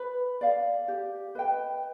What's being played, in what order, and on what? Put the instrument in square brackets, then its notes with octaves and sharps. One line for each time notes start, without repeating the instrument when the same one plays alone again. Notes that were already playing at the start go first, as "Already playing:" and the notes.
Already playing: [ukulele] B4
D5 F5
G4
B4 D#5 G5